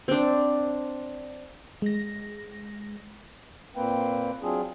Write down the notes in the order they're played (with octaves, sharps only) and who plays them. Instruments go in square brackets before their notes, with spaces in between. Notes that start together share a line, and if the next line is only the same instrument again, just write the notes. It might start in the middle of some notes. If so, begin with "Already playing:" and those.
[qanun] C4 D4
[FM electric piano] G#3 A#6
[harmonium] A#2 A#3 C4 B4 G5
F#3 C4 D4 F4 G#4